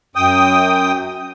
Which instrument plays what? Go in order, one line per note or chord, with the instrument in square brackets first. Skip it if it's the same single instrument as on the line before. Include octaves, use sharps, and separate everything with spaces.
[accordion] F#2 G5 D#6